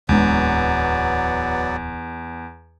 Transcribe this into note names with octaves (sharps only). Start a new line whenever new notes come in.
D1 E2 F#3 G#3 B3 D4 D5